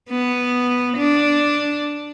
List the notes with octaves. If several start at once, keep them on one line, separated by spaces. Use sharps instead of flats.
B3
D4